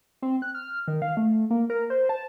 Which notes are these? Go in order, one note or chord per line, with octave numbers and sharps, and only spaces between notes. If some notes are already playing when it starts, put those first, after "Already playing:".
C4
F#6
F6
D#3
F5
A3
A#3
A#4
C5
A5